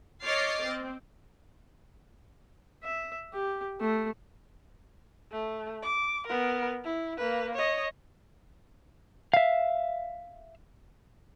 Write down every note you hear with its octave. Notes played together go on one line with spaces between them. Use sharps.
C#5 D#5 D6 F6 A6 C7
C4
E5
G4
A3
A3
D6
B3 A#4
E4
A#3 B4
C#5 D#5
E5 F5